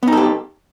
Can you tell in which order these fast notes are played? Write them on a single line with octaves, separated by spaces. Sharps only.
B3 D#4 A4 G4